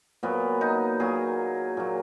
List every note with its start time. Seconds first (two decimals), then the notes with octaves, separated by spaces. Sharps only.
0.23 A#2 F#3 B3
0.61 D#4
1.00 A#2 F#3 G#4
1.77 A#2 F#3